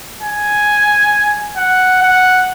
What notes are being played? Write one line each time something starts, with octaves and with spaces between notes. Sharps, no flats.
G#5
F#5
F#5